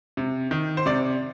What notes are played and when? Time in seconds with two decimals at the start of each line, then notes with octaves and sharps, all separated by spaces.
0.17 C3
0.51 D#3
0.77 C5
0.86 C3 D5